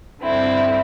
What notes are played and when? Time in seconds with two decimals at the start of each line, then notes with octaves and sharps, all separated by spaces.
0.22 G2 D3 C4 E4